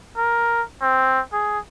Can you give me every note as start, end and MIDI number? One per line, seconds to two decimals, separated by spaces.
0.17 0.62 70
0.82 1.21 60
1.33 1.59 68